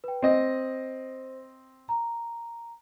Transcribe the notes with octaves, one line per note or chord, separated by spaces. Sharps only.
B4 G5
C4 C5 D#5
A#5